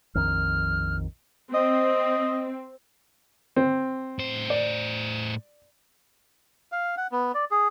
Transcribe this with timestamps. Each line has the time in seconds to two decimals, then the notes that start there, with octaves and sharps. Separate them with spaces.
0.15 A#1 F2 D#3 F6
1.54 C4 D#5
3.56 C4
4.19 A2 C5
4.50 D5
6.72 F5
6.97 F#5
7.12 B3
7.35 D5
7.51 G#4